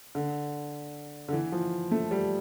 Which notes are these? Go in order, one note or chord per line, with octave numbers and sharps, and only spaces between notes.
D3
D3
E3
F3
A3
G3